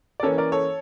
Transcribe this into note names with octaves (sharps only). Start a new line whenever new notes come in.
D5
E3 A#3 C#4 A4 C#5
A#4 D5
A4 C#5